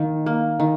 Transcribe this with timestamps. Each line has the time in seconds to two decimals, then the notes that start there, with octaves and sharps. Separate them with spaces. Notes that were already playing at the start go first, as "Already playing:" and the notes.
Already playing: D#3 A#3
0.26 A#3
0.60 D#3